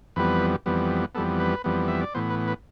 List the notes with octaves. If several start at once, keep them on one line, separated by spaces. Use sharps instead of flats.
F2 E3 G3 B3 B4
F2 E3 G3 B3
F2 E3 G3 B3 A4
B4
F2 E3 G3 B3
E5
D5
A2 E3 B3 C5
B4
B4